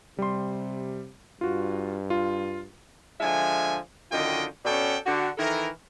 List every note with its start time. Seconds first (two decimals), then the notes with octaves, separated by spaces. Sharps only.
0.19 C3 G3 C6
1.41 G2 F4 F#4
2.10 F4
3.21 D3 F3 G#3 E5 G#5
4.11 F#2 D3 D#3 F4 D#5 G5
4.65 B2 C#4 A4 D5 F#5 G5
5.05 D3 F#4 G4
5.38 D#3 E3 E4 A4 A#4